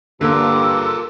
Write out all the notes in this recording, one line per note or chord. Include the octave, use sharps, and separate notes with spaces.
G2 D3 A#3 F4 A4 A#4 D6 E6